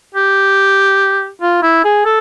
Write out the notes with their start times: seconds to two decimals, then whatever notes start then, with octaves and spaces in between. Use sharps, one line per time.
0.15 G4
1.42 F4
1.63 E4
1.84 G#4
2.05 A4